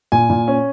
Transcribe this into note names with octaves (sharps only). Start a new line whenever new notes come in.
A#2 G#5
A#2
C#4